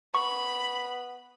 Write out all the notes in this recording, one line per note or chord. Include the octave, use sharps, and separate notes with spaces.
B3 B5 C#6